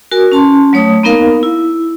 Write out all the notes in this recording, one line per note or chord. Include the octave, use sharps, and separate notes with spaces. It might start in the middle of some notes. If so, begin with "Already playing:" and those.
F#4 A#4 G#5
C#4 A5 C6
F#3 A3 C#5 D#6
A#3 B3 D#4 A#4 F5
E4